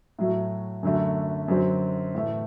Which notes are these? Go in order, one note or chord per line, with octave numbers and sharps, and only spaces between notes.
A2 F#3 A3
F#2 D3 F#3 A3
F#2 D3 F#3 C4
A2 E3 A3